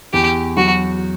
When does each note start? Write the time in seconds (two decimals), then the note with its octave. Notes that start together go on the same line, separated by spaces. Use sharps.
0.13 E2 G4
0.57 F#3 F#4